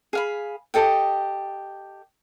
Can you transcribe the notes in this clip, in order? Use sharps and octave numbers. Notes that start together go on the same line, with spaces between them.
G#4 F5 B5
G4 A4 D#5 G5